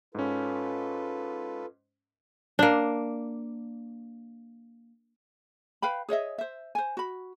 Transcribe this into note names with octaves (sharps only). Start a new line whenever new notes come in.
G#2 C#4 F4 A4 B4
A#3 D4
B4 F5 G5 B5
G#4 C#5 D#5 E5
C5 E5
C5 G#5
F#4 B5